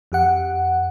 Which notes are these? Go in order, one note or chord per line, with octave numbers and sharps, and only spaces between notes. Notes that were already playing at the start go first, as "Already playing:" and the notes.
F2 G4 F#5